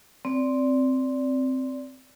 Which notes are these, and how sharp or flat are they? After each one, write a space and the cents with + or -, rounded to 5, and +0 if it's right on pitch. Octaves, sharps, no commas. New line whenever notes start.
C4 +0 D5 -15